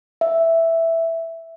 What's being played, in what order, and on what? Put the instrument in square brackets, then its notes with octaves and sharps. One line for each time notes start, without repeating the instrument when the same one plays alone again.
[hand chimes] E5